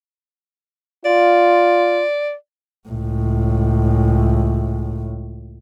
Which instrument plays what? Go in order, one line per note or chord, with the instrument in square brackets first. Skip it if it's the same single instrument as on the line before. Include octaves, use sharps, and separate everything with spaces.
[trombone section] F4 [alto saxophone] D5
[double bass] C#2 A2